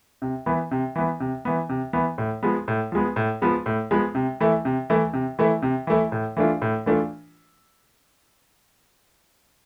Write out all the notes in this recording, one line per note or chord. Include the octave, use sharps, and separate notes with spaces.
C3
E3 B3
C3
E3 B3
C3
E3 B3
C3
E3 B3
A2
F3 G#3 B3
A2
F3 G#3 B3
A2
F3 G#3 B3
A2
F3 G#3 B3
C3
E3 A3 E4
C3
E3 A3 E4
C3
E3 A3 E4
C3
E3 A3 E4
A2
E3 A3 D4 F4
A2
E3 A3 D4 F4